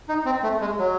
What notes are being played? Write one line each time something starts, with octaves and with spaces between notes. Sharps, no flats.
D#4
C4
A3
G#3
F#3